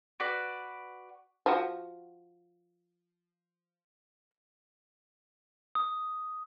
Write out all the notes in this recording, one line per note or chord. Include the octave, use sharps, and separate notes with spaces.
F#4 B4 D5
F3 F#4
D#6